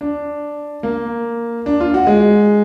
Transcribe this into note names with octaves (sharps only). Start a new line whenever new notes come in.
D4
A#3
D4
F4
F#4
G#3